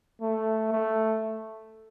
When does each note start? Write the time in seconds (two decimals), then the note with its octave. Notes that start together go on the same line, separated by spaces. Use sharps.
0.21 A3
0.72 A3